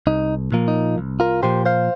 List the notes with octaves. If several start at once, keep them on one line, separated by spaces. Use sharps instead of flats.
C2 D#4
A#2 F3 A#3
D#4
C2
F4 A#4
A#2 F3 A#3 G4 C5
C5 F5